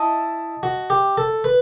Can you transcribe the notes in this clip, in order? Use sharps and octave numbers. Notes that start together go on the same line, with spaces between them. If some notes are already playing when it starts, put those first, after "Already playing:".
Already playing: E4 D#5 A5
F#4
G4
A4
B4